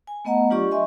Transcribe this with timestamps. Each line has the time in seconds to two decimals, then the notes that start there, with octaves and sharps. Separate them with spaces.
0.07 G#5
0.25 A3 B3 D#5 F#5 A#5
0.50 F#3 D4 F4 G4 D5 C#6
0.71 D#5 E5 G#5 C6 C#6